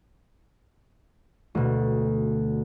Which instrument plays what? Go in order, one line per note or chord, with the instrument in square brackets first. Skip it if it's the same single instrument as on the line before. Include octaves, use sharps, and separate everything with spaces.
[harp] D2 B2